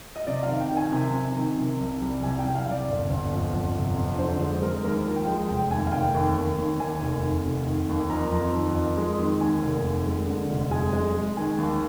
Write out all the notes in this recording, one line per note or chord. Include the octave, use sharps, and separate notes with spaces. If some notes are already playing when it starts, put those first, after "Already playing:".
D#5
C3 D5
F5
D#3
G5
D#3
G#5
C3
C3
D#3
C3
C2
G3
C2 G#5
G5
C2
F5
C2 D5
G1
G1
F2
G1
C3
F2
D3 C5
G#3 C5
G#3 A#4
D#2 A#4
F3
G5
G#3
F1 G5
D#2 G#5
F5
F1 G5
D#2
D#2
D#2
D#2 G#5
F1
D#3
F1
D#3
D#2
F2 A#5
F2
D#3
F2
G#3
D#3
D#2 G#5
F1
D#2
G#3
D3
F1
G#3 G#5
G#3
G#3
D#3 G#5
D#2